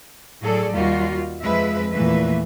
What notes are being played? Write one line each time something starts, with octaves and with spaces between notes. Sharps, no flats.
A2 F#3 G#4 A4 D5
D#2 G3 F4 F#4
F2 F3 G#3 B4 E5
E2 A#2 E3 A3 B4 E5